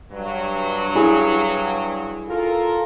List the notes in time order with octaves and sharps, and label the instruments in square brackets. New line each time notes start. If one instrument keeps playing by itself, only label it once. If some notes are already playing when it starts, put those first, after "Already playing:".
[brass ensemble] G2 F#3
[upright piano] E4 G#4
[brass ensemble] F4 A4 A#4